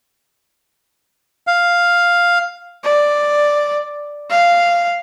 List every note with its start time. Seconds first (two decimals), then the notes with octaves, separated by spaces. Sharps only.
1.47 F5
2.83 D5
4.30 F5